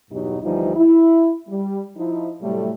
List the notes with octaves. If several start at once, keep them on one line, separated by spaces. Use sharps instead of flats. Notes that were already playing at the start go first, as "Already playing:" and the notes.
E2 G2 B2 F#3 D#4 G4
D2 E3 F3 G3 D#4 F4
E4
G3
F3 D#4 E4
A2 C3 F#3 G3 A3